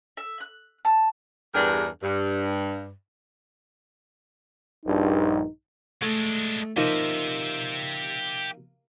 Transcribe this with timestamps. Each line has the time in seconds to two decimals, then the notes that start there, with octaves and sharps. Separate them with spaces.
0.17 E5
0.40 F#6
0.85 A5
1.54 E2 G2 D4 G4 G#4 A#4
2.03 G2
4.85 A#1 G2 D#4
6.02 G#3 A3 D4
6.77 F3 A#3 D#4 G4 E5